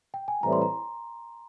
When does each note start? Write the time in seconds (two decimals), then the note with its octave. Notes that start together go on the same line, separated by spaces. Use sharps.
0.14 G5
0.28 G#5
0.43 A2 E3 G3 C4 E4 A#5
0.53 C6
0.62 A#5